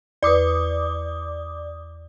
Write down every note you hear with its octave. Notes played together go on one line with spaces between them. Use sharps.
E2 B4 D5 D6 D#6